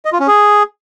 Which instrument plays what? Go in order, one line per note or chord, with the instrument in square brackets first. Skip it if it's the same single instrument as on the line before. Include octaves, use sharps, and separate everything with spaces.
[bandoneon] D#5
F4
C#4
G#4